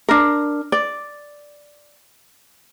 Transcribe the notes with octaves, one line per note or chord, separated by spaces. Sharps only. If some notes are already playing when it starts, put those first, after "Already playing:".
D4 A#4
D5